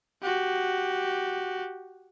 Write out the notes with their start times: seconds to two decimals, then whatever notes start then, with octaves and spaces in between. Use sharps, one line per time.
0.22 F#4 G4